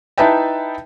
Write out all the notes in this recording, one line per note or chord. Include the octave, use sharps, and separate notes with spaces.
D#4 E4 B4 E5 G5 A5